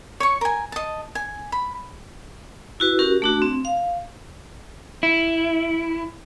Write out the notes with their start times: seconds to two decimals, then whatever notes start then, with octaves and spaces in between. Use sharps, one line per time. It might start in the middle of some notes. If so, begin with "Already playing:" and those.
0.20 C#5 C#6
0.41 A#4 G#5
0.72 D#5 A5
1.15 G#5
1.52 B5
2.80 E4 F#4 B4
2.99 C#4 F#4 G4 A#4
3.22 A3 D4 F#4
3.42 C4
3.65 F5
5.03 E4